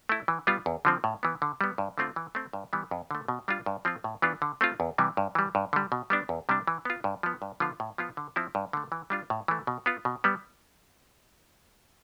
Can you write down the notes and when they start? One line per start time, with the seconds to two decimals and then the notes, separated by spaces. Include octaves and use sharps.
0.09 A3 E4
0.28 E3
0.47 G3 B3 F4
0.66 E2
0.85 D3 F3 C4
1.04 A2
1.23 E3 B3
1.42 D3
1.61 G3 B3
1.78 G2
1.98 D3 A3 C4 F4
2.16 E3
2.35 A3 C4
2.53 G2
2.73 E3 G3 B3
2.91 F2
3.11 D3 A3
3.28 B2
3.48 G3 D4 F4
3.66 G2
3.85 F3 C4 F4
4.04 A2
4.22 E3 B3 D4 F4
4.42 D3
4.61 A3 C4 F4
4.80 E2
4.98 C3 E3 G3
5.17 G2
5.35 E3 G3
5.55 G2
5.73 D3 G3
5.92 B2
6.10 G3 B3 D4
6.29 E2
6.49 C3 G3 D4
6.67 E3
6.85 B3 F4
7.04 G2
7.23 F3 B3
7.42 G2
7.60 D3 F3 B3 F4
7.80 A2
7.98 F3 B3 F4
8.17 D3
8.36 F3 C4 E4
8.55 G2
8.73 D3 A3
8.92 E3
9.10 G3 D4 F4
9.30 A2
9.48 E3 A3
9.67 B2
9.86 B3 F4
10.05 B2
10.24 G3 B3